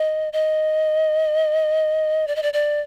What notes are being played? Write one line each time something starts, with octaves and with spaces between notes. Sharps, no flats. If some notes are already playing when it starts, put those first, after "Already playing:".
Already playing: D#5
D#5
D5
D#5
D5
D5